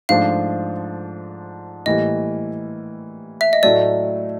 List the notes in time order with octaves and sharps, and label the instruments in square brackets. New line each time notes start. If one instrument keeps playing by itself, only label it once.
[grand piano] G#2 F3 A3 D4 [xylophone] F5
[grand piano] A2 E3 G3 A#3 [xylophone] D#5
[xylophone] E5
D#5
[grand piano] A2 F#3 A3 [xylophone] D5